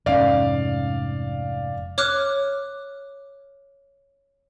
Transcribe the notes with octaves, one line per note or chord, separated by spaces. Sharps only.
F1 G#2 C#4 D5 F5
C#5 D6 F6 F#6